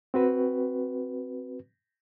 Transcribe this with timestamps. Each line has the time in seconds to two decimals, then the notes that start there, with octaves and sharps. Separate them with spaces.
0.14 C4 F#4 B4